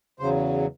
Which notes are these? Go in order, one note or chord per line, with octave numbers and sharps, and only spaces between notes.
E2 C#3 F#3 C5